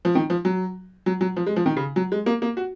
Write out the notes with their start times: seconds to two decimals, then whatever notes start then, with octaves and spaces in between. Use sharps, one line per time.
0.05 F3
0.15 D#3
0.30 F3
0.45 F#3
1.06 F#3
1.21 F#3
1.37 F3
1.47 G#3
1.56 F3
1.66 D#3
1.77 C#3
1.96 F#3
2.12 G#3
2.26 A#3
2.42 A#3
2.57 F#4